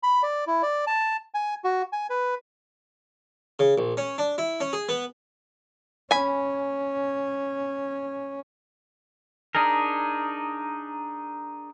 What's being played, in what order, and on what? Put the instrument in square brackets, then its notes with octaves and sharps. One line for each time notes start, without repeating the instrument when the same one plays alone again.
[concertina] B5
D5
E4
D5
A5
G#5
F#4
G#5
B4
[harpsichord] C#3
A#1
C#4
D4
E4
C#4
G#4
B3
[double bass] C#4 [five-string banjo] G#5 B5
[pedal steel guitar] D4 D#4 G#4 A#4